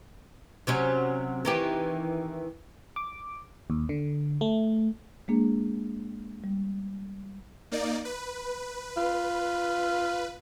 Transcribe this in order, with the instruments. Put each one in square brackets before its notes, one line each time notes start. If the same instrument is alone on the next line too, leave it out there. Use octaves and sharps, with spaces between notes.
[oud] C3 F#3 C#4
D#3 E3 G4
[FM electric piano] D6
D#2
D3
A3
[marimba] G#3 A#3 D4 G#4
G3
[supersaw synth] A#3 D#4 D5
B4
[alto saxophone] F4